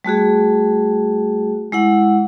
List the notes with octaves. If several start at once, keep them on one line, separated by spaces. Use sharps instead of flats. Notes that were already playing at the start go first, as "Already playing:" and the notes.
G3 A3 F#4 G#4
G#3 E4 F#5